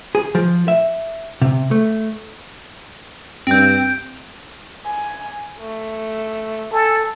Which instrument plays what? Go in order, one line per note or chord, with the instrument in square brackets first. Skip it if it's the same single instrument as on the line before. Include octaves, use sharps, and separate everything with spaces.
[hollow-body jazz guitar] G#4
F3
E5
C3
A3
[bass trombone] G2 [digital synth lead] C4 [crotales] G6 D7
[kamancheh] G#5
A3
[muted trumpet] A4 [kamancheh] G#5